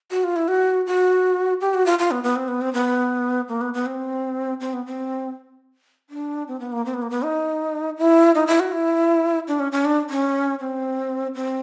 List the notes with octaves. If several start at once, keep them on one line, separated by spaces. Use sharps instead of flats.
F#4
F4
E4
F#4
F#4
G4
F#4
F4
F4
B3
B3
C4
B3
C4
B3
A#3
B3
B3
C4
C4
B3
C4
D4
C4
B3
A#3
C4
B3
A#3
B3
D#4
E4
D#4
E4
F#4
E4
D4
C#4
C#4
D4
C#4
C4
C4